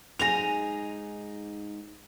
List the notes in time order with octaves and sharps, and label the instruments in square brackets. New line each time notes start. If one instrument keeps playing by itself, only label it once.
[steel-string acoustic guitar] G#2 D#4 G#4 [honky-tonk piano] A#6 F7